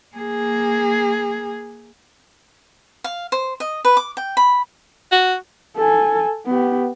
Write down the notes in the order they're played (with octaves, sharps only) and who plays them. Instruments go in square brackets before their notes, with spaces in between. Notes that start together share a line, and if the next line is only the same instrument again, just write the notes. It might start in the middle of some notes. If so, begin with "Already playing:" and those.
[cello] A#3 G#4
[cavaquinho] F5
C5
D#5
B4
D6
G5
B5
[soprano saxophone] F#4
[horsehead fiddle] A4 G#5
B3 G4